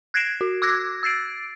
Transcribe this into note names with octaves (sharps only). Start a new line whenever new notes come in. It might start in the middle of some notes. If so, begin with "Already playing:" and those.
F#6 G#6 A#6 C7 D7 E7
F#4
D6 E6 F#6 G#6 A#6
E6 A6 C7 D7